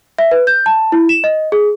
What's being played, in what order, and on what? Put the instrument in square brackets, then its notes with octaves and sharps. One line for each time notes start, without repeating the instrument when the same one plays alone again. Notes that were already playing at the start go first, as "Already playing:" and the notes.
[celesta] E5
B4
G6
A5
E4
E7
D#5
G#4